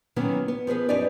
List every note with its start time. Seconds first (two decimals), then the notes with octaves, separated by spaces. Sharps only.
0.16 D#3 E3 F#3 A#3 B3 C#4
0.48 B3
0.67 F3 B3 G#4 B4
0.89 F#2 D#4 G4 B4 D5 G#5